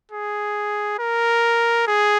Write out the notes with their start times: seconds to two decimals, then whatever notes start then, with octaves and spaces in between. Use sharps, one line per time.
0.12 G#4
0.99 A#4
1.87 G#4